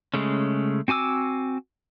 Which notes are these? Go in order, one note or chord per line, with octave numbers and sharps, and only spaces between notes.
C#3 G#3 A3 C#4
C4 F#4 G#5 D6 E6